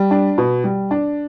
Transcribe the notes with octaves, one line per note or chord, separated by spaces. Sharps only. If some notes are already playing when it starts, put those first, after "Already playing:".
Already playing: G3
D4
B2
G3
D4